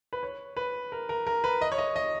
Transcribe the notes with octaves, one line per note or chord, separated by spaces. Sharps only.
B4
C#5
B4
A#4
A#4
A#4
B4
D#5
C#5
D#5
D#5